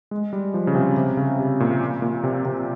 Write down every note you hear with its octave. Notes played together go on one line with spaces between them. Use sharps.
G#3
G3
F3
C#3
C3
C3
C#3
C3
A#2
A#2
C3
C3